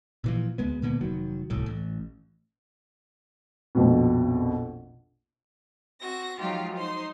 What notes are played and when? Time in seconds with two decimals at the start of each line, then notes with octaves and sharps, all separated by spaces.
0.24 A#2 E3 F3
0.58 D2 G#3 B3
0.82 A#2 D3 A#3 B3
1.01 F1 D#3 F#3
1.50 D1 C2 A2
1.66 A1
3.75 A#1 F2 B2
6.01 C4 F#4 A#6
6.39 F3 F#3 G#3 D#4 F4 G4
6.74 D#4 C5 C6